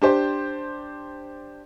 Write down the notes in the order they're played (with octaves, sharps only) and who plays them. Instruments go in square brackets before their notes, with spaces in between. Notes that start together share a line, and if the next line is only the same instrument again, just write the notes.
[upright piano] D4 G4 C5